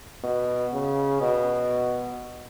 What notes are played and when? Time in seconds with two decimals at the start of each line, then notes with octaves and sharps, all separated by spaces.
0.24 B2
0.73 C#3
1.21 B2